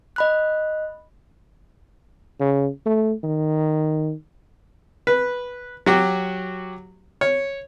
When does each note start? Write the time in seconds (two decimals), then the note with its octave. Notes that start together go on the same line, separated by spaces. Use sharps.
0.16 D#5 B5 F#6
2.40 C#3
2.86 A3
3.23 D#3
5.07 B4
5.86 F#3 F#4 G4
7.21 C#5